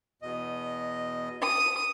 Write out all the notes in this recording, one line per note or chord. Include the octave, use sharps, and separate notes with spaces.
E2 B2 D#5
D#6